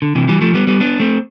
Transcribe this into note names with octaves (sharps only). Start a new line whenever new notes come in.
D3
C3 E3
E3 G3
F3 A3
G3 B3
G3 B3
B3 D4
A3 C4